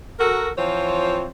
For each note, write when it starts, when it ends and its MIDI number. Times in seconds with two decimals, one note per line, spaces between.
0.19 0.50 66
0.19 0.50 69
0.19 0.50 70
0.58 1.27 52
0.58 1.27 53
0.58 1.27 60
0.58 1.27 65
0.58 1.27 72
0.58 1.27 73